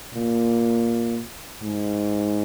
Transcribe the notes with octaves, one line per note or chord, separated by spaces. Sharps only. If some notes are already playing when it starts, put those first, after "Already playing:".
A#2
G#2